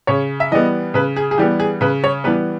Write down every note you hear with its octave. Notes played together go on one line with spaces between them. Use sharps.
C#3 C#5
E5
E3 G3 B3 D#5
C#3 B4
G#4
G#4
E3 G3 B3 G4
G#4
C#3 B4
C#5
E3 G3 B3 B4